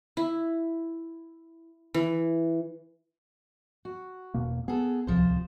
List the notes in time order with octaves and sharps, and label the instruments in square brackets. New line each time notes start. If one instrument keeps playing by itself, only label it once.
[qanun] E4
E3
[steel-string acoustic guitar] F#4
[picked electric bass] E1 B2 A#3
[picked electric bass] B3 [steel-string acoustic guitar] G#4 A4
[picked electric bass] D1 C2 [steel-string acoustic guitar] F3 C5